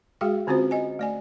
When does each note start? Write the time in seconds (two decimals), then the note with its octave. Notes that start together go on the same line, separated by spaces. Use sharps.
0.21 G#3 F#4 G#4 F5 G5
0.47 D3 C4 C#4 F4 F#4 C5
0.71 D#5 G#5
0.99 A3 D5 G#5